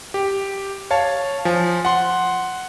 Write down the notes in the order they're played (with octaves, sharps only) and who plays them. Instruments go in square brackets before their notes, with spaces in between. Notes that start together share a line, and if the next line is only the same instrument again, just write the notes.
[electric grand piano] G4
C#5 F5 A5
F3 G#5
F#5 C6